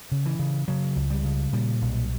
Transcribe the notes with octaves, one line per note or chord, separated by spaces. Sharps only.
C#3
E3
C#3
C#3 F#3
C#2
G3
C#3
A#2 G3
B1